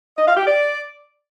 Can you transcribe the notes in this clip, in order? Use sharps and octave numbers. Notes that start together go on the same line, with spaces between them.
D#5
F5
G4
D5